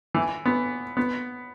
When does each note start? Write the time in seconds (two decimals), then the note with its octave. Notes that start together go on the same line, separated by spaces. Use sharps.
0.14 E3
0.45 B3
0.97 B3